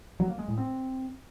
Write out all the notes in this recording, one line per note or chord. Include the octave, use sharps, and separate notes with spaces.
F#3
A#3
G#3
A2
C4